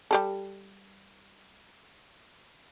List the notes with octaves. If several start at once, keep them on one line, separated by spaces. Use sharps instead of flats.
G3 G4 A4